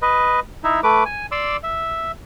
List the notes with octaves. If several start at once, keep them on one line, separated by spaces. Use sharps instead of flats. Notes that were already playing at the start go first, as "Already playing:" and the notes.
B4 D#5
D#4 E4 E5
A3 B4 D6
G#5
D5 C6 D6 E6
E5